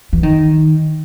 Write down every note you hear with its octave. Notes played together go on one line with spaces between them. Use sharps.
E3
D#3